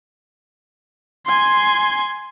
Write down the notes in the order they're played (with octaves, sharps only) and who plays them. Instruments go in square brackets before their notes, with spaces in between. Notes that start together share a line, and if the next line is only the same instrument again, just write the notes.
[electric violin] G#5 C6